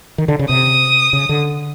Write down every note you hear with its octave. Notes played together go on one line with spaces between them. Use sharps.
D#3
D3
C#3
C3 D#6
C#3
D3